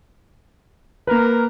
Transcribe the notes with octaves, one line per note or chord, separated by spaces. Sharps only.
A#3 A#4 B4